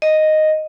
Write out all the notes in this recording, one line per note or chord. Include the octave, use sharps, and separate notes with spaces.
D#5